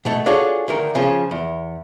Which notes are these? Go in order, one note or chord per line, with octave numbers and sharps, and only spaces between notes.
B2 A3 A4
D4 F4 F#4 G#4 A4 C#5
D2 D#3 A#4
C#3 F3 C#4
E2